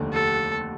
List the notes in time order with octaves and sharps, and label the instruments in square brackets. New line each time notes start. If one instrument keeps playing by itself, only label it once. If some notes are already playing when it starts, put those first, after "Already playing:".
Already playing: [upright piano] F1 D#2 D3
[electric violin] A4